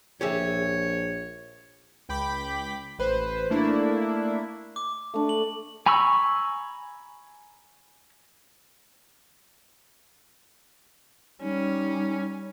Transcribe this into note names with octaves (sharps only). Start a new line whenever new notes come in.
A#1 G4 G#4 C#5 E5
C#2 G5 B5 D6 B6
A1 B4 C5
A3 A#3 D4 E4
D6
A3 D4
F#7
G#5 A#5 B5 C#6 E6
G3 C#4 D#4